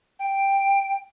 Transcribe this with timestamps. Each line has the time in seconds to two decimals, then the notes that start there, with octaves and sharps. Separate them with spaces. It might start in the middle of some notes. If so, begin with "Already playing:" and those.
0.19 G5